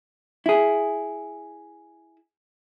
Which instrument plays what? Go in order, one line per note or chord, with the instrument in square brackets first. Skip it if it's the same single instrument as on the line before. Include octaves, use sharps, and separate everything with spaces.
[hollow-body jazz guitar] E4 G#4